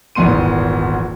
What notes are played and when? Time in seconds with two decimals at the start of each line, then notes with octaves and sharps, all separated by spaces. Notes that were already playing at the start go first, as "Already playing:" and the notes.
0.15 D#1 G#1 E2 B3 C6 D#7